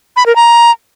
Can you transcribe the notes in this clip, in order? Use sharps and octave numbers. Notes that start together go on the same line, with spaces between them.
B5
A#4
A#5